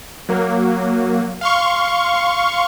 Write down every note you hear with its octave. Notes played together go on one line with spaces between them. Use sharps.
F#3 A#3
F5 C6 C#6